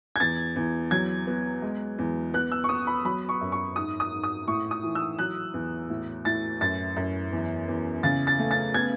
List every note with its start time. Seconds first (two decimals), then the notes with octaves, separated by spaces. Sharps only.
0.16 G#6
0.20 E2 A6
0.56 E2
0.91 F#3 G#6
1.27 B3
1.62 G#3
1.98 E2
2.34 B3 F#6
2.52 E6
2.64 C#6
2.69 B3 D#6
2.87 B5
3.05 F#3 B5
3.29 C#6
3.41 F#2
3.52 C#6
3.76 G#2 D#6
4.00 D#6
4.12 G#2
4.24 D#6
4.48 A2 C#6
4.71 D#6
4.83 E3
4.95 E6
5.19 F#3 F#6
5.54 E2
5.90 A2
6.25 A2 A6
6.61 F#2 A6
6.96 F#2
7.32 E2
7.68 E2
8.03 C#3 A6
8.27 A6
8.39 A3
8.51 A6
8.74 B3 G#6